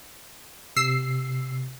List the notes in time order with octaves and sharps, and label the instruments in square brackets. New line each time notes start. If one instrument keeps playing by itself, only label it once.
[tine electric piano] C3 [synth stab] E6 C7